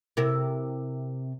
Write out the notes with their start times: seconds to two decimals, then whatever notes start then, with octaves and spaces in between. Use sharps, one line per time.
0.17 C3 E4 A#4